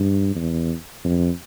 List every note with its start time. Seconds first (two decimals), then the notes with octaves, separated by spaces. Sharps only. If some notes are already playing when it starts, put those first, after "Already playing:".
Already playing: G2
0.35 E2
1.05 F2